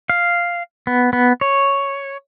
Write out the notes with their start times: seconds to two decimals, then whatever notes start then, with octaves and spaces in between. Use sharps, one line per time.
0.10 F5
0.87 B3
1.13 B3
1.41 C#5